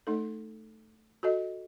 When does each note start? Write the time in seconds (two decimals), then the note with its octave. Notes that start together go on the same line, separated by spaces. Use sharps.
0.07 A3 D#4 A4
1.23 F#4 A4 D#5